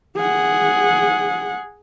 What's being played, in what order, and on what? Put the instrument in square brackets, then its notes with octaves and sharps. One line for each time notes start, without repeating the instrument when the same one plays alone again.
[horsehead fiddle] G#4 F#5